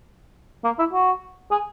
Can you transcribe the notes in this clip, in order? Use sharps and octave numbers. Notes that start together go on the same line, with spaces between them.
A#3
E4
F#4
G#4